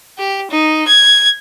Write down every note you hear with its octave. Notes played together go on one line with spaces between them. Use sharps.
G4
D#4
G#6